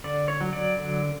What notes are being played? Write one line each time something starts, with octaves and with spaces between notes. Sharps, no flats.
D3 D5
C#5
F#3
D5
D3